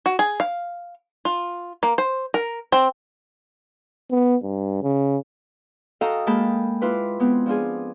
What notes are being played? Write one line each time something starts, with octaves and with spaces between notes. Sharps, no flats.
F#4
G#4
F5
F4
A#3
C5
A#4
C4
B3
G2
C#3
F#4 A4 D#5 F5 G5 A#5
G#3 A#3 G5 A5 B5 F6
E4 F4 B4 D6
G#3 B3 C4
F3 D4 F4 G#4